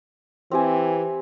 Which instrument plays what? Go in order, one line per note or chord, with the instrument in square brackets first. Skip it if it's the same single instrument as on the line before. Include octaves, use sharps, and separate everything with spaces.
[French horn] E3 [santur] C4 G4 G#5